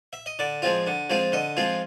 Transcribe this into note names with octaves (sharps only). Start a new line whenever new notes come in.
E5
D#5
D3 D5
F3 G#3 C4 F4
D3
F3 G#3 C4 F4
D3 D#5
F3 G#3 C4 F4